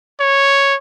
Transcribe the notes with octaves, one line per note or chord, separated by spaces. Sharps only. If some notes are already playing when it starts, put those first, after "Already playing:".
C#5